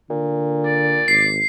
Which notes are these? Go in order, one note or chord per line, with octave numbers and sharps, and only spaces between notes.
A#2 D3
D5
G#1 C7